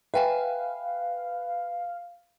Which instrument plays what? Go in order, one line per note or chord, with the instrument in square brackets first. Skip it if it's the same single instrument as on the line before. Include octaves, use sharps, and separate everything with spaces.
[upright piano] B4 [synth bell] E5 G5 G#5 [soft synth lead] F5